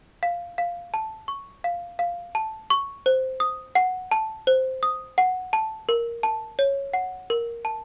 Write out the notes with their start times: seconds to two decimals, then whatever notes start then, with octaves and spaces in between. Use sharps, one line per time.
0.23 F5
0.58 F5
0.94 A5
1.28 C#6
1.64 F5
1.99 F5
2.35 A5
2.70 C#6
3.06 C5
3.40 D#6
3.75 F#5
4.11 A5
4.47 C5
4.83 D#6
5.18 F#5
5.53 A5
5.89 A#4
6.23 A5
6.59 C#5
6.94 F#5
7.30 A#4
7.65 A5